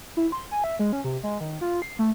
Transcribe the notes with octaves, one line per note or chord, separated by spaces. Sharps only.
E4
C6
G#5
E5
G#3
C#4
C3
G#3
D#3
F4
C7
A3